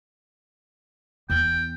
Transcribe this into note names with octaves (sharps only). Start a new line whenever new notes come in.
E2 B3 G5